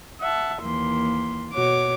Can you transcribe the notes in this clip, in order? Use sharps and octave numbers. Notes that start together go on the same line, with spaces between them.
E5 F#5 A5
D#2 E3 A#3 C6
B2 F#4 C#5 D6